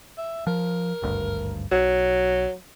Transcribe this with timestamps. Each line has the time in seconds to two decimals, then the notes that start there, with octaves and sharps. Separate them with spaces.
0.18 E5
0.47 F3 A#4
1.02 G#1 D2 G2
1.72 B1 F#3